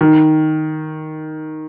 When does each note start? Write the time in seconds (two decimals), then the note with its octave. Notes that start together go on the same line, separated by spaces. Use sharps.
0.01 D#3